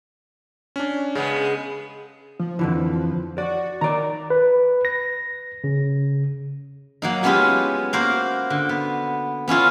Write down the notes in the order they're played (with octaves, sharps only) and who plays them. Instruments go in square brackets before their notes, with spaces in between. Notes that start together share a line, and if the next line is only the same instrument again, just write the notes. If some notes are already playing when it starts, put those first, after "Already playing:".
[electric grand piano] C#4 D4
[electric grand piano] C#3 [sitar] G#3 B3
[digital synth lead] F3
[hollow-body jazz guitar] F2 D3 E3
[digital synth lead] F#4 [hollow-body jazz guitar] D5
[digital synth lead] D#3 [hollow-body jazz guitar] D5 A#5
[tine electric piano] B4
A#6
C#3
[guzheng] F#3 A#3 D#4
G#3 B3 C#4 E4 F4 G4
A#3 F#4 A#4 C5
D3
B3
B3 C#4 E4 F4